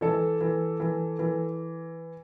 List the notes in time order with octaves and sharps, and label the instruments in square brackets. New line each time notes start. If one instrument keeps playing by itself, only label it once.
[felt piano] E3 [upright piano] A4
[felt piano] E3
E3
E3